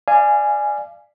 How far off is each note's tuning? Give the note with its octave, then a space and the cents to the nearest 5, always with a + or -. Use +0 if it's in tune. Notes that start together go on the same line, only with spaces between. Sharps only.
D5 +20 F5 -25 G#5 +0